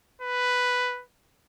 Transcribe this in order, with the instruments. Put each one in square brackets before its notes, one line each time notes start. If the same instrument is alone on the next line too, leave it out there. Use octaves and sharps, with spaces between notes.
[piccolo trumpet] B4